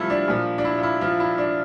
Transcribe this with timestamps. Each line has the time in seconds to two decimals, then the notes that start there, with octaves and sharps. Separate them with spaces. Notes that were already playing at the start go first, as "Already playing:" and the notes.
Already playing: C3 F3 G3 A3 E4 F4
0.10 D4
0.28 A#2 F3
0.58 D4
0.65 E4
0.79 F4
0.83 E4
1.01 F3 F4
1.20 E4
1.38 D4